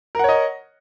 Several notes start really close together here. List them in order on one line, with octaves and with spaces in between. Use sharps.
A#4 F#5 C#5 D#5